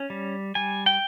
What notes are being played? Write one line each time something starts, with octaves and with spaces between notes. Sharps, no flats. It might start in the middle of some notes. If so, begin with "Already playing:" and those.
Already playing: C#4
G3
G3 G#5
G5